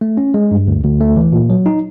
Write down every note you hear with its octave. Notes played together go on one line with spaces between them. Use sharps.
A3
C#4
G#3
G2
D2
D2
A3
E3
A#2
F#3
D#4